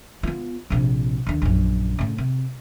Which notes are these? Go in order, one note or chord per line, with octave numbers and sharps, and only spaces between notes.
B3 F4
A#1 C3
D#2 D3
A#1 F#2
A2 C#3
C3